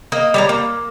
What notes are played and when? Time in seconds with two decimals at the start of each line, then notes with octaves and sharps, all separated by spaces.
0.12 A#3 D#5
0.34 G3 C#4 A#5
0.49 A#3